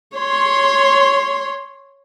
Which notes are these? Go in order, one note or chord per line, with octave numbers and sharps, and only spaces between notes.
C#5 C6